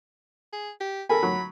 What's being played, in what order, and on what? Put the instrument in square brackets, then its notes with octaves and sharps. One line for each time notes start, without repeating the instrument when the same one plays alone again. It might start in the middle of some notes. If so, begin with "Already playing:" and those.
[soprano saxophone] G#4
G4
[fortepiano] A4 A#4 G#5 [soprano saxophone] B5
[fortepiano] F#3